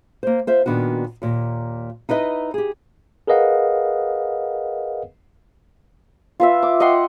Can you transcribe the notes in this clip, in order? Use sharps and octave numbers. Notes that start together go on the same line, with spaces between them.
A#3 C5
F4 C5 E5
A#2 D#3 B3 D4 F#4
D#2 A#2
D#4 E4 B4 D#5
G4 G#4
G#4 A#4 B4 D#5 F5 F#5
F4 B4 E5
D6
D#5 F#5 G5 C6